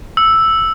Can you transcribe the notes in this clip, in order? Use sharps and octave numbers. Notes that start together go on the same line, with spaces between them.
E6